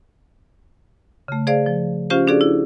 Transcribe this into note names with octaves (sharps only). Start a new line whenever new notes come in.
C#3 A3
G#4 C5 D5 F5
F3
C#4 F4 G4 C5 F5
C#4 D4 F#4 G#4 A4 D5
E4